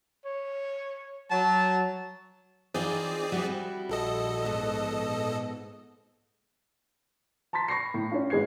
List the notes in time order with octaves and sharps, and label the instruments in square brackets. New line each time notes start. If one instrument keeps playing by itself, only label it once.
[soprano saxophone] C#5
[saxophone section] F#3 [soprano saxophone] A5
[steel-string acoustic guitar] E3 D#4 F4 [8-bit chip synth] C4 G#4 D5
[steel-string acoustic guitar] G3 E4 F#4
[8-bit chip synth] A#1 A4 D#5
[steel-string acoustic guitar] G#2 B3
[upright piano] A5 A#5 C6 A6 B6
B5 C#6 A#6 C7
A2
C#4 D4 F4
G#1 G#3 B4 G#6 C7